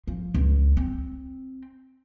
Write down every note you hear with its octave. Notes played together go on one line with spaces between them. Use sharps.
F3
C#2
C4